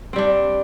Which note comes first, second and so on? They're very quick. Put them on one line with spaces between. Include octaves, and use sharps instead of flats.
C4 G3 D4